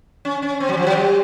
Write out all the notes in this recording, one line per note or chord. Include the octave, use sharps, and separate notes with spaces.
C#4
C#4
C4
F#3
F3
F#3
G3